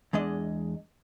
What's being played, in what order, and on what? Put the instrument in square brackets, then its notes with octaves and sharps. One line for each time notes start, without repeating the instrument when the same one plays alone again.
[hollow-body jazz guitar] E2 G#3 D4 D#5